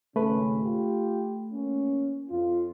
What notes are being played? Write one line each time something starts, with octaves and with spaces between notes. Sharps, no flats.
G#1 C#3 A3 C#4 B4
F4 G4
A#3 C#4
F2 F4